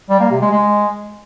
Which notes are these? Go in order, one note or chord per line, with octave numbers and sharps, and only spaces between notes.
G3
A#3
C3
G#3
G#3